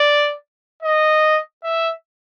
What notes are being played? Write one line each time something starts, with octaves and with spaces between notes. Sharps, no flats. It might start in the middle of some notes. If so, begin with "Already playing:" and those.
Already playing: D5
D#5
E5